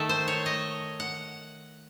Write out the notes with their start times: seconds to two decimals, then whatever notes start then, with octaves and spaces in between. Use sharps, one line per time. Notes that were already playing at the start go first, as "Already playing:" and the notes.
Already playing: D#3 A3 A4
0.09 C5
0.28 C#5
0.46 D#5
1.00 F#5